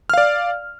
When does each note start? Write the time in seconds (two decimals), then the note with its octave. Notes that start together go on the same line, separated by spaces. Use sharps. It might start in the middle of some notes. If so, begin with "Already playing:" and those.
0.10 F6
0.14 F5
0.18 D5